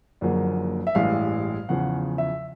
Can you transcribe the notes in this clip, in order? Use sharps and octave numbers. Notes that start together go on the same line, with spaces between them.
F#1 F#2 D3 F3 A#3
E5
A1 G2 E3 G#3 F5
E2 C#3 F3 F#5
E5